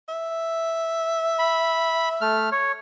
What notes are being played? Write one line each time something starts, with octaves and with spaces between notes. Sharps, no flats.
E5
B5
A3 F6
C#5